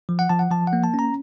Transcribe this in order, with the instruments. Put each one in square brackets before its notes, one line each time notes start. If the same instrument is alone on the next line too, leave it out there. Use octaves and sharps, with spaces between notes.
[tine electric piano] F3
F#5
F3 A5
F#5
F3 A5
F#5
A#3
A5
C#4 A#5